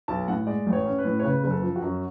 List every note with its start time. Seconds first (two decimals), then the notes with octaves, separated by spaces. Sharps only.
0.08 B1 A5
0.28 A2 F#5
0.47 G#3 D5
0.67 A1
0.73 C#5
0.85 C#4
0.98 B4
1.05 A2
1.19 C#5
1.24 C#3 B4
1.44 F#1
1.51 A4
1.63 F3
1.76 F#4
1.82 F#2